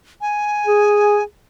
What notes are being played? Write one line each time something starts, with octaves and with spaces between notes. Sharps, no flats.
G#5
G#4